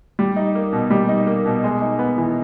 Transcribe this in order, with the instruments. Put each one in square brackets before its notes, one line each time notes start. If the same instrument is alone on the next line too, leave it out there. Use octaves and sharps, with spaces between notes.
[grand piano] G3
D#4
A#3
B2
G3
D#4
A#3
B2
G#3
D#4
B3
E3